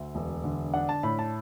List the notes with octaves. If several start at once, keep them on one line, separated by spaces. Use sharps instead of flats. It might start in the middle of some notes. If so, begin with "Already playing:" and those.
Already playing: D2 E5
E1
D3
D4 F#5
A5
A2 B5
A5